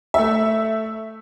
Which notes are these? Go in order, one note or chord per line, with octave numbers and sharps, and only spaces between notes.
A3 E5